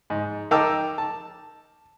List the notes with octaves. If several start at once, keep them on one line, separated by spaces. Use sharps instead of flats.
G#2
D#4 A#4 G5 A5 D6 E6
A5